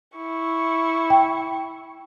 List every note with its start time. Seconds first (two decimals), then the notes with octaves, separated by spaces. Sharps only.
0.18 E4 C#6
1.10 G5